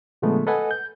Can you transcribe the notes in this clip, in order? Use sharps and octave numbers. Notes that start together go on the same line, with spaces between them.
A#2 D3 F3 G#3 A3 B3
A4 B4 D#5 F#5 G#5
G6